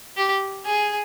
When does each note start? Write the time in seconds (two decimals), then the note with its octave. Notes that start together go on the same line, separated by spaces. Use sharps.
0.17 G4
0.65 G#4